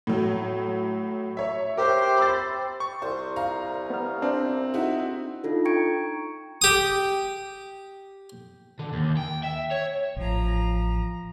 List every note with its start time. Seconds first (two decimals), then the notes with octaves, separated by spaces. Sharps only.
0.07 A2 F#3
1.37 C#5 E5
1.77 G4 A#4 C5 E5
2.18 B5 E6 A6
2.80 C#6
3.02 C2 C5
3.36 F5 A#5
3.90 B3 F6
4.22 C4 D4
4.74 D#4 E4 F#4
5.44 D4 D#4 F4 A4
5.65 G5 A#5 C#6 G#6 C#7 D7
6.62 G4 D#6
8.79 D3
8.93 D#2
9.17 G5
9.44 E5
9.72 C#5
10.16 A1 F3 A#5